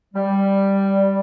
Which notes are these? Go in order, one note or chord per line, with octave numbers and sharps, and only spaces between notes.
G3